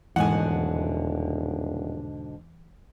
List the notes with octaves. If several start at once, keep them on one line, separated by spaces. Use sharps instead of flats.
D#1 E2 G#2 B2 D3 F#5 G#5